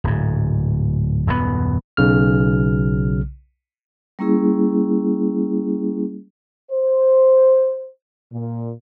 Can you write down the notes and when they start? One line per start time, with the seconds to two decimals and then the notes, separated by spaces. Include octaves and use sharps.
0.04 D1 G#2
1.27 D#1 F#2 A2 B3
1.97 B1 C#3 F6
4.19 G3 A#3 C#4 E4 G#4
6.71 C5
8.33 A#2